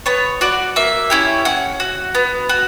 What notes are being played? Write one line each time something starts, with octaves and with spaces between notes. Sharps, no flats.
B3 C#5
F#4 D5
A#3 E5
C#4 E4 G4
C#4 F#5
F#4
B3
F#4